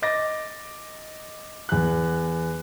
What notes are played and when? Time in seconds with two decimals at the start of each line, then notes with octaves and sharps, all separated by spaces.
0.02 D#5 D6 A6 A#6
1.69 E2 F#6